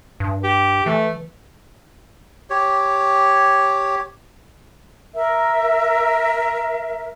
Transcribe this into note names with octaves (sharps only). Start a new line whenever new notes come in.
G2
G4
E3 A3
G4 C#5
A#4 E5